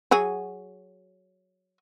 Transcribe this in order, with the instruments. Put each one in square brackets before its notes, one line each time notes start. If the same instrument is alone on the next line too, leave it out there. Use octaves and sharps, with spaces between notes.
[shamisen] F#3 F#4 G#4